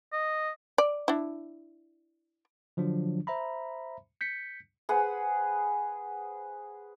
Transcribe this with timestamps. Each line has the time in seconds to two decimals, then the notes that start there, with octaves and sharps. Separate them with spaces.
0.13 D#5
0.78 D5
1.08 D4 E4
2.77 D3 F3 F#3 D4
3.27 C5 E5 A#5 B5
4.21 G6 B6 C#7
4.89 G#4 B4 C5 F#5